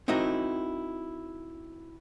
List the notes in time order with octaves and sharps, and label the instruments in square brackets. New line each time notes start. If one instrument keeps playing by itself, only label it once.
[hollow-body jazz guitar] C4 D#4 E4 F#4 A#4